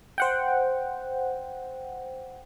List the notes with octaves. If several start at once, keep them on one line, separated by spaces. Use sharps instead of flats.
C5 F#5 G5